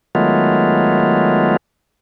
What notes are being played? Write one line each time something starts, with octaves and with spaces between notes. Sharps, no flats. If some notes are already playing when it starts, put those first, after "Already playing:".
D#3 F#3 G#3 A3 B3 F4